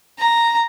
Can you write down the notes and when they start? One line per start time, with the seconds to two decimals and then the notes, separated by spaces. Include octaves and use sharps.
0.19 A#5